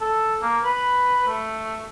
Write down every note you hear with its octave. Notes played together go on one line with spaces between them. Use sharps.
A4
A#3
B4
A3